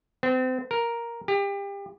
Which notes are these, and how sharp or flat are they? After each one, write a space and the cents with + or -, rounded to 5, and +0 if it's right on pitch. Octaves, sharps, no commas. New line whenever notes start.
C4 -35
A#4 +5
G4 +30